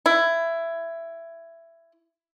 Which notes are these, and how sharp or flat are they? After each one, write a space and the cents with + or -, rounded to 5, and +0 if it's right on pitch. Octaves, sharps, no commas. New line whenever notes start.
E4 +15